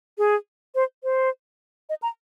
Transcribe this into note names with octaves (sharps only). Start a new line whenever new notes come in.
G#4
C5
C5
D#5
A#5